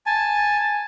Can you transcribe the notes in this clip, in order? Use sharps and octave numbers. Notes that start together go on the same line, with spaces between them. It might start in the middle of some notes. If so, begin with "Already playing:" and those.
G#5 A5